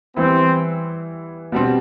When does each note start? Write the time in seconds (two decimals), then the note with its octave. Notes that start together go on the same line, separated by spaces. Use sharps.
0.16 E3 G3 B3 C4 E4
1.52 B2 G3 C4